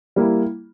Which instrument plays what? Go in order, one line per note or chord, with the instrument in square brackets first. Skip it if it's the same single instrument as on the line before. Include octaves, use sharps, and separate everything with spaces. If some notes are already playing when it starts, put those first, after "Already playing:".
[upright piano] G3 A#3 E4